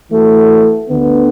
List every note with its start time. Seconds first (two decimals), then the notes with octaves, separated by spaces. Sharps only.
0.11 E3 A3 F#4 A4
0.89 D2 D3 B3